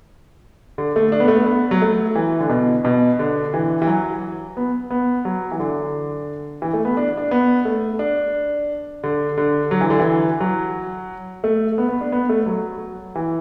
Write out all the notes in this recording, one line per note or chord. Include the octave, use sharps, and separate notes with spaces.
D3
A3
D4
B3
A3
B3
B3
F#3
A3
E3
D3
B2
B2
D3
E3
E3
F#3
B3
B3
F#3
E3
D3
E3
A3
B3
D4
D4
B3
A3
D4
D3
D3
F#3
E3
D3
E3
F#3
A3
B3
B3
D4
B3
A3
F#3
E3